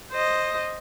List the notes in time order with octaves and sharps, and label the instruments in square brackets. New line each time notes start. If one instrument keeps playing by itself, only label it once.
[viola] C5 D#5